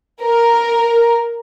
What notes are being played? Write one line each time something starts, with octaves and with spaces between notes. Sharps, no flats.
A#4